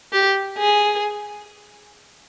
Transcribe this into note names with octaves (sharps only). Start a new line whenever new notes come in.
G4
G#4